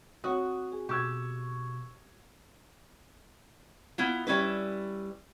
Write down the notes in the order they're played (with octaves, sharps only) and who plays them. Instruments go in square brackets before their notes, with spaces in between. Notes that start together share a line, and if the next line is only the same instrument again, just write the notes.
[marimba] C4 C#5 [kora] F#4 [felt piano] F#5 D#6
[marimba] G#4 G#5
[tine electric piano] B2 [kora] G4 [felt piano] C#6 E6 G#6
[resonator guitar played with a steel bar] B3 E4 F4
G3 C#4 E4 B4